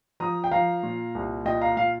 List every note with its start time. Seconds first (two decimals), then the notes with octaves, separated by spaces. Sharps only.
0.20 F3 A#5 D#6
0.44 G5
0.51 F3 F5 A#5
0.83 A#2
1.15 C2
1.45 A#2 D#5 G5
1.61 F5 A#5
1.77 A#2 F5